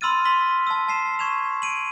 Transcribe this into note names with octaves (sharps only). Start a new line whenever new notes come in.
B5 C6 E6 F6 A6 D#7
C6 E6 B6 G7
A5 E6
A5 C7 E7
C#6 G#6 E7 F7
D7 D#7 F#7